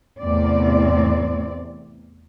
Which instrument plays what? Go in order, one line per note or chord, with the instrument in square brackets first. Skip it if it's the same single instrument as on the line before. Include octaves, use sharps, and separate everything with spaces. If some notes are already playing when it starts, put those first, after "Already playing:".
[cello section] E2 A2 C3 C4 D5